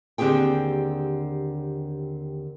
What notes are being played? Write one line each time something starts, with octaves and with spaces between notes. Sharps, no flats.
D#2 D3 C4 G4 G#4 G5